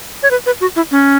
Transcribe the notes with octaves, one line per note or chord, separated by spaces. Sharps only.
C#5
B4
B4
F#4
E4
C#4